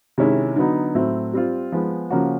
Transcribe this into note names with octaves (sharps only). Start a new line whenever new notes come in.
C3 D#3 G#3 C#4 E4
D3 F#3 B3 D#4
A2 F#3 A3 C4
G3 C4 F4
F3 G#3 B3
C#3 F3 A#3 C#4 F#4